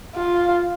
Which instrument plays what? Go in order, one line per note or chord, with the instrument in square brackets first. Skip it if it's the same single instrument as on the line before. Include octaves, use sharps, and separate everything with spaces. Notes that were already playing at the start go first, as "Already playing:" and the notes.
[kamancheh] F4